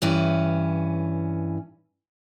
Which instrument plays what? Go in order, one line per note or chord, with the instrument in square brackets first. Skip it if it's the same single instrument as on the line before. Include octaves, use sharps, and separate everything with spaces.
[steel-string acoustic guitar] G2 E3 C#4